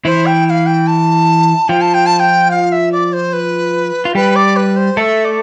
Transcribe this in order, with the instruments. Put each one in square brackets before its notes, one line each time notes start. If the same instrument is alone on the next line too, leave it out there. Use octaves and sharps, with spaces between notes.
[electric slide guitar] E3 E4 [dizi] C5
[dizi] G5
G5
F5
G5
A5
[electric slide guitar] F3 F4 [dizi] G5
[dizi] A5
G5
A5
G5
F5
E5
D5
C5
B4
[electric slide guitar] F4
[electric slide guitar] G3 G4 [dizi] B4
[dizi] D5
B4
C5
[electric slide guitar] A3 A4 [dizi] E5
[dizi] D5